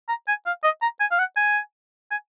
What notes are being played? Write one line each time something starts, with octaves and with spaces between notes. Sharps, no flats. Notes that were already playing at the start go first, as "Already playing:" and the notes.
A#5
G#5
F5
D#5
A#5
G#5
F5
F#5
G#5
G#5